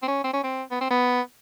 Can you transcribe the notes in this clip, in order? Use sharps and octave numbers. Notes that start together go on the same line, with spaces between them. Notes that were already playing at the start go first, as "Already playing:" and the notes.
C4
C#4
C4
C#4
C4
B3
C4
B3